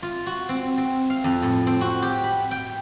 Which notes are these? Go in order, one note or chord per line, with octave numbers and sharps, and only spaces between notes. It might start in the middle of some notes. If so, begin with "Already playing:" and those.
F4
F#4
C4
C4
F5
F2
A2
C4
F#4
G4
B5
G5